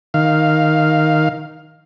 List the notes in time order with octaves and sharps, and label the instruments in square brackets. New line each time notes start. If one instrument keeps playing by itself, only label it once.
[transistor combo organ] D#3 F5